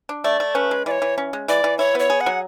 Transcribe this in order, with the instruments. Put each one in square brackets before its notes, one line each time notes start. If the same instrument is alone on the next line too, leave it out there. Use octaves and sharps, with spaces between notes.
[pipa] D4
[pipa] A3 [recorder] D5
[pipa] A3
[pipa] C#4 [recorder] B4
[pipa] G#3
[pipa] E3 [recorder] D5
[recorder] C#5
[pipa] E3
C#4
G#3
[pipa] E3 [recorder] D5
[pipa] E3
[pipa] E4 [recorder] C#5
[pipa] B3 [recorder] C#5
[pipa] G#4
[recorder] F#5
[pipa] F#3